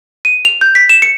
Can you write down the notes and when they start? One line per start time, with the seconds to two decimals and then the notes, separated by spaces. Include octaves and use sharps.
0.25 D#7
0.45 F7
0.61 G6
0.75 B6
0.89 E7
1.02 C#7